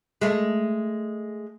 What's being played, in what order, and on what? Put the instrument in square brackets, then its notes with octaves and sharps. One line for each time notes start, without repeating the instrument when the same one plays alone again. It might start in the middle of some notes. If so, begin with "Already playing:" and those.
[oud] G#3 A3